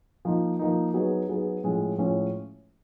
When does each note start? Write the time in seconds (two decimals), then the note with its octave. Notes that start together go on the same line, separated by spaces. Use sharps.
0.25 F3 A#3 D#4
0.59 F3 A#3 D#4
0.94 F#3 B3 D#4 G#4
1.29 F#3 B3 D#4 G#4
1.63 A2 F3 G#3 C#4
1.98 A2 F3 G#3 C#4